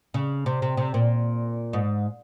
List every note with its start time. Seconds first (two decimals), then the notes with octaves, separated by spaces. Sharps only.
0.14 C#3
0.46 C3
0.62 C3
0.77 C3
0.94 A#2
1.73 G#2